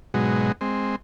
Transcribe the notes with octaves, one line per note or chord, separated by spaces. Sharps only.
G#2 B2 F#3 G#3
G#3 C4